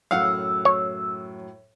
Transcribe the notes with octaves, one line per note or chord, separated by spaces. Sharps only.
F#2 A2 F#3 F5 F#5 E6
C#5